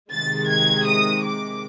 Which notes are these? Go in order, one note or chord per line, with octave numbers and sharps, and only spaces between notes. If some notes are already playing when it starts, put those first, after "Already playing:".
C3 D#3 G#3 A6
G#6
D#6
D6